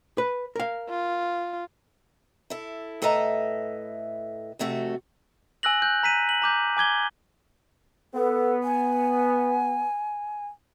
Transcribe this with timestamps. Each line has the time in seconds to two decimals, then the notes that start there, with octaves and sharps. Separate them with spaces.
0.18 B4
0.56 A#4 F5
0.89 F4
2.50 E4 A4
3.02 A2 A4 B4 D#5 E5 A#5
4.59 F2 C3 A3 F#4
5.63 G#5 E6 F#6 A#6 F#7
5.82 F#6 G6
6.03 A#5 B6 D#7
6.29 F#7
6.42 A#5 D6 G6
6.77 G#5 D6 G#6 G7
8.14 B3 A4
8.63 G#5